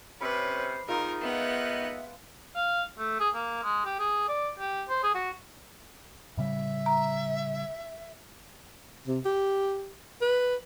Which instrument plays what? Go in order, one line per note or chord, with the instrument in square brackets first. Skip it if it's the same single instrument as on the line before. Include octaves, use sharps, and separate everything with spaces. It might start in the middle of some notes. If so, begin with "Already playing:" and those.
[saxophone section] C3 C#4 [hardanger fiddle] B4 [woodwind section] C5 [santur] B5 D6
[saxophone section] D#3 F3 D#4 [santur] G#3 F4 E6 [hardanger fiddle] A#4
[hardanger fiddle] B3 F#5 [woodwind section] D#5 E5
[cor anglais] F5
A3
G#4
A#3
G#3
G4
G#4
D5
G4
C5
G#4
F#4
[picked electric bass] A2 C#3 G3 [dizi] E5
[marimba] A#5
[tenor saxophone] C3
G4
B4